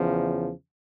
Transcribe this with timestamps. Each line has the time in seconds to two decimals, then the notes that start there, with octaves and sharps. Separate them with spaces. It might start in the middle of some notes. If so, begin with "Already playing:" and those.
Already playing: E2 C#3 F3